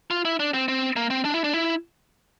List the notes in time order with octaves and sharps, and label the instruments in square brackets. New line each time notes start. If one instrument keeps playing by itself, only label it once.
[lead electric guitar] F4
E4
D4
C4
C4
A#3
C4
D4
E4
D4
E4